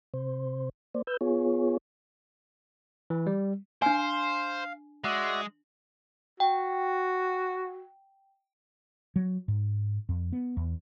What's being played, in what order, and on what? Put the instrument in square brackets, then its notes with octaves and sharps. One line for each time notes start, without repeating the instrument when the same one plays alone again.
[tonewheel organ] C3 C5
A#3 C5 D5
B4 E6 G6
B3 F4 G#4 C#5
[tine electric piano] E3
G3
[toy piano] D4 G#5 [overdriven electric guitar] C5 [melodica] F5
[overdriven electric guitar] G#3 [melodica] F#4 D5 E5
[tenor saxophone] F#4 [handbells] G5
[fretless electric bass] F#3
G#2
F2
B3
E2